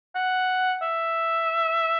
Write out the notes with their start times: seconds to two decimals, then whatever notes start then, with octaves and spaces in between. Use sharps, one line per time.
0.15 F#5
0.82 E5